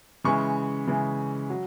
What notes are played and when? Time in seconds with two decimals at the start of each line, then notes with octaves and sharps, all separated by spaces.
0.24 C#3 E3 G#3 C#6
0.87 C#3 E3 G#3
1.50 F#3